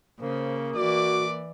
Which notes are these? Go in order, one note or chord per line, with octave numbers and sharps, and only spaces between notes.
C#3 A#3 C5
E3 F#4 D5 D6